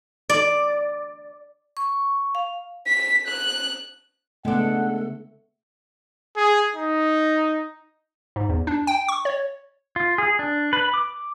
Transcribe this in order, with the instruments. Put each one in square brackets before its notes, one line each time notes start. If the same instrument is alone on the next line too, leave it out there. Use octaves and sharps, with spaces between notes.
[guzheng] D5
[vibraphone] C#6
F5
[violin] B6
F#6
[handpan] C#3 A3 B3 [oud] G#3 D4 [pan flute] A4 [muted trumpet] F#5
[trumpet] G#4
D#4
[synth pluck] G#2
E2
D4
G5
C#6
C#5
[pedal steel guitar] F4
G#4
D4
B4
D6